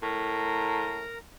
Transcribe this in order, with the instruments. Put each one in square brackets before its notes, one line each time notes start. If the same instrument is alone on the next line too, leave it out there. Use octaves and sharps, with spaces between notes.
[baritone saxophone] A2 [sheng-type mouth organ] A#4 A#5